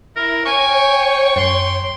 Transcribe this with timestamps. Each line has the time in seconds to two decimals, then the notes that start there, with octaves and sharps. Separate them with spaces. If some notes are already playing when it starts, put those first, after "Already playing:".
0.16 E4 A#4
0.46 C#5 G5 G#5 C#6
1.36 F#2 C6